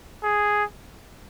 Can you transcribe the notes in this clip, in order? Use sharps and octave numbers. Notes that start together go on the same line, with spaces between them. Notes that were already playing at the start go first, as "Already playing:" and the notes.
G#4